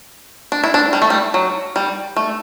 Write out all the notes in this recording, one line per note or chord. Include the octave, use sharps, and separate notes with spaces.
D4
E4
D4
G3
A3
G3
F#3
G3
A3